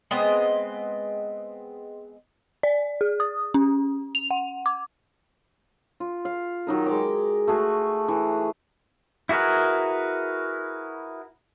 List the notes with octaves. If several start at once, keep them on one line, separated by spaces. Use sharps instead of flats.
G#3 B3 C4 D#5
D5
G#4
D#6
C#4
F7
F#5
D6
F4
F5
D#3 F#3 D#4 A#4
G#3 G5 D6
A3 F#4 G#4
E3
E4 F#4 G#4 A#4 B4